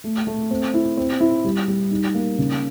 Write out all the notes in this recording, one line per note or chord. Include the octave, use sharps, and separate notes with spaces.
A3
A3
C4
E4
C4
E4
G3
G3
D#4
A#3
C#3